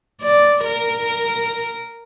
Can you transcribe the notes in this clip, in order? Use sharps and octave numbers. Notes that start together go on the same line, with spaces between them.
D5
A#4